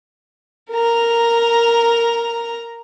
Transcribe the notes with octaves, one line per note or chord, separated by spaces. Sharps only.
A#4 A#5